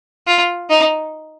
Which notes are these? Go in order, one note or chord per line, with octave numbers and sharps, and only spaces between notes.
F4
D#4